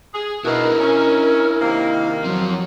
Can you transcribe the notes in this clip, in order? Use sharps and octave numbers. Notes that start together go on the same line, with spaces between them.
G#4
B2 D#4 E4 A#4
C#4
C3 D#3 A#3
F3 F#3 C4